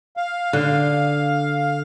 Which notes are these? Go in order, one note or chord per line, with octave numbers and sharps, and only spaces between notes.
F5
D3